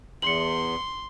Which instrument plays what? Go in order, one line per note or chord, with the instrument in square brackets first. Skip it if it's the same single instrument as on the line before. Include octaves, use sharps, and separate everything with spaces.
[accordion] E2 [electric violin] C6 [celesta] C#7 F#7